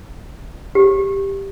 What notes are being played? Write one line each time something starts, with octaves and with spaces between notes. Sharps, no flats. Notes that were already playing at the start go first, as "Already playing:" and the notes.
G4